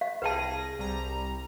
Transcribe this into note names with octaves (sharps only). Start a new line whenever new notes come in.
F5
C2 G#4 B4 G5 A5 A#6
C2 G3 A#5